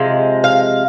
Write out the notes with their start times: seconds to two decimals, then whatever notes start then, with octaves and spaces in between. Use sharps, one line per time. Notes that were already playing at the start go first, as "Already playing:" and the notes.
Already playing: C3 F3 G#3
0.44 F5